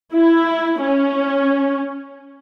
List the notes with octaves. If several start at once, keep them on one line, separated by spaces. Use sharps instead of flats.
E4
C#4